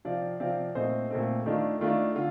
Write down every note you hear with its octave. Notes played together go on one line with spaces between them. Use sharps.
C3 F3 C4 D5 F5
C3 F3 C4 D5 F5
A#2 A3 C4 C5 D#5
A#2 A3 C4
D#3 A3 D4 F4
D#3 A3 D4 F4
D3 F4